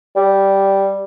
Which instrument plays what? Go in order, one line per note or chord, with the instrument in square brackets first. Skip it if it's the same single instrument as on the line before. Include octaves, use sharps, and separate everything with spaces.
[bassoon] G3